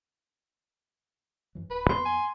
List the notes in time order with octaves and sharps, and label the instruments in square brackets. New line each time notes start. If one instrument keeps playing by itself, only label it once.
[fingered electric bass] F#2 E3 F#3
[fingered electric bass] D1 [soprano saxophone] B4
[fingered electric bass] F2 A#3 B3 [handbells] C6
[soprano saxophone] G#5